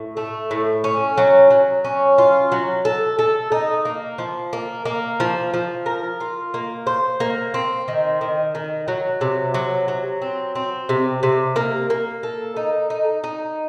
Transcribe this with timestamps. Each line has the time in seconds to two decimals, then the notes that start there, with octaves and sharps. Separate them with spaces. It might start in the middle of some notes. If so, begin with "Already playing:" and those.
Already playing: A2
0.17 A3
0.51 A2
0.84 C#4
1.18 F#3
1.51 F#3
1.85 C#4
2.18 F4
2.52 F#3
2.85 A4
3.19 A4
3.52 D#4
3.85 A#3
4.18 F3
4.53 A#3
4.85 A#3
5.20 F3
5.54 F3
5.86 A#4
6.20 F4
6.54 A#3
6.87 C5
7.20 A#3
7.54 C4
7.88 D#3
8.21 D#3
8.55 D#3
8.88 F#3
9.21 C3
9.54 F#3
9.88 F#3
10.22 C4
10.55 C4
10.89 C3
11.23 C3
11.56 A#3
11.90 A#3
12.23 A4
12.56 D#4
12.90 D#4
13.24 D#4